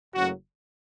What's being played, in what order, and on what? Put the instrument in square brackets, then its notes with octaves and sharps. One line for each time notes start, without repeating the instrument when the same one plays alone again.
[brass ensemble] F#1 F#2 C#3 F#3 A3 F#4